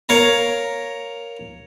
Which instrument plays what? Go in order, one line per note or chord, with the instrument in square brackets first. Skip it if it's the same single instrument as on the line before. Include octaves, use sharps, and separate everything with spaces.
[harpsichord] A#4 C#5 F5 A#5